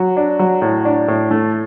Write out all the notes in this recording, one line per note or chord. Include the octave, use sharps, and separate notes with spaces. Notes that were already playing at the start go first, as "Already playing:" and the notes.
Already playing: F#3
D4
F#3
A2
D4
A2
A3